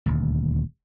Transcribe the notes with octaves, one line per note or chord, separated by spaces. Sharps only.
D#1 D2